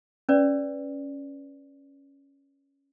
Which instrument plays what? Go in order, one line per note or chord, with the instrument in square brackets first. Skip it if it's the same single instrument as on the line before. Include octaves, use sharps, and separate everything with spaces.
[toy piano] C#4 B4 D5